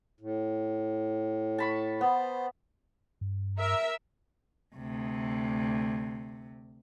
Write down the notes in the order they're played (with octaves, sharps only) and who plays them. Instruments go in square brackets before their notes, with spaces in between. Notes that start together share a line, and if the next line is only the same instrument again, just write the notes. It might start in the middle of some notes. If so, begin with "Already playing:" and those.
[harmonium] A2
[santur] A5 B5 C#6
[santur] B3 [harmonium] C5
[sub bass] G2
[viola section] A#4 E5
[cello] D2 C3